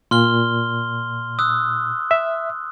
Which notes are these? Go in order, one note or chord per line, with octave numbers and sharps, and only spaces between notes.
A#2 C6 F6 G7
D#6 E6 F#6
E5